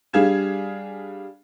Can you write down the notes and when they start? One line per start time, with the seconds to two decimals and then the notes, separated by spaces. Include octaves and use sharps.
0.13 G3 D4 G#4 F5 G#6 E7